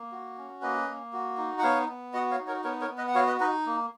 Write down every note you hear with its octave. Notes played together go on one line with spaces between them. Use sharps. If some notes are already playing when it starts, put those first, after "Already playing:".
Already playing: A#3
F#4
C#4
A#3 B4 D#5
A#3
F#4
D#4
F#5
B3 C#5 F5
B3
F#4 D#5 F#5
C#5 F5
D#4
A#4 C#5
B3 A#4 C#5
A#4 C#5
B3
B4 D#5
F#5
F#4 C#5 F5
B4 D#5
D#4 B4 D#5
A#3